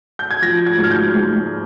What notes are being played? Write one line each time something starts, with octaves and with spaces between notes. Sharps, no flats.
G6
G#6
F3 A#6
G#6
G#2
F6
G6
G#2